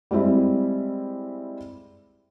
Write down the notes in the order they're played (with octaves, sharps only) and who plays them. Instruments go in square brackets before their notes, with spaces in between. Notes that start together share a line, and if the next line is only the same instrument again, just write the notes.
[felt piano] G3 G#3 C4 E4